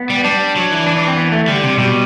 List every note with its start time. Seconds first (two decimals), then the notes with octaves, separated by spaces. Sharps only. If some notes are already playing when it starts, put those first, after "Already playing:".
Already playing: B3
0.10 G3
0.24 G3 D4
0.56 F#3
0.71 E3
0.87 D4
0.97 D4
1.07 C4
1.17 B3
1.32 A3
1.48 D3 G3
1.63 C3
1.78 B2 G3